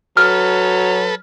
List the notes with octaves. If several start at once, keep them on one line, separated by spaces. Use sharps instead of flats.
F#3 A4 B4 F6